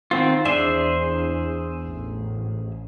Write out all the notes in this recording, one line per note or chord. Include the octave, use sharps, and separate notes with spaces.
D#3 B3 C4 F4
E2 D4 G#4 C5 E5
A1